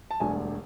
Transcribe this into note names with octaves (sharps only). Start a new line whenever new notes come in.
A5
E1 D2 D3 G3 G#5